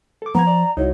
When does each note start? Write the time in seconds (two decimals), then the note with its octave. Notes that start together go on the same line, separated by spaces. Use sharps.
0.22 A4 D6
0.35 F3 B3 A#5 G#6
0.47 D5
0.77 C2 D#4 E4 F#4 C#5